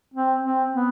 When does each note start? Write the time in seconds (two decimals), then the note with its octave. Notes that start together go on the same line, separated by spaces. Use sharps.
0.14 C4
0.43 C4
0.72 B3